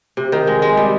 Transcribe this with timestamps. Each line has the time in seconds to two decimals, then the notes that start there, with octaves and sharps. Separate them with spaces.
0.17 C3
0.32 D#3
0.47 G#3
0.62 G#3
0.77 G3